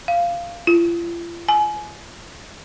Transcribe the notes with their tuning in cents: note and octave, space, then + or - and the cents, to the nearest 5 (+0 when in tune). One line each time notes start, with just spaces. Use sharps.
F5 -15
F4 -45
G#5 +25